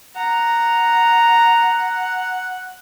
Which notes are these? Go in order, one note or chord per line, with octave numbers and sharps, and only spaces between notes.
F#5 A#5